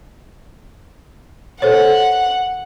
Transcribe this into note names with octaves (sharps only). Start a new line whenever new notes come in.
A4 C5 C#5 F#5